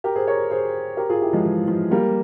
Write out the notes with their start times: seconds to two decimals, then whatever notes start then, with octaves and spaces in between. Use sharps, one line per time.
0.04 G4 A#4
0.15 G#4 C5
0.27 A#4 C#5
0.51 G#4 C5
0.97 G4 A#4
1.09 F4 G#4
1.21 E4 G4
1.33 F3 G#3
1.44 E3
1.68 F3
1.91 G3 A#3